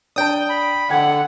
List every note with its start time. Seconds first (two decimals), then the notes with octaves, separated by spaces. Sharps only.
0.16 D4 D5 G5 A5 D#6
0.49 B5
0.90 D3 F#5 G5 G#6